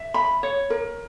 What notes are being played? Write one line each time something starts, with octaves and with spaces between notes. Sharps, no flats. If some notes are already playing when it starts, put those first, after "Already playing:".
Already playing: E5
B5
C#5
A#4